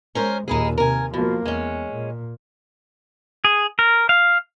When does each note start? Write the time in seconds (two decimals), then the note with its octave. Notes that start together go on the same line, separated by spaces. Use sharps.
0.15 G#3 C#4 A#4 C5
0.48 D#2 A#2 D#4 E4 G#4
0.78 C3 A#4 G#5
1.14 B2 F3 A#3
1.45 E2 G#3 C#4
1.92 A#2
3.45 G#4
3.79 A#4
4.09 F5